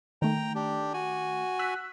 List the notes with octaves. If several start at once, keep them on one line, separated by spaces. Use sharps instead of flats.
D#3 A3 G5 A#5
D4 G4
F#4 G#5
E6 F#6 B6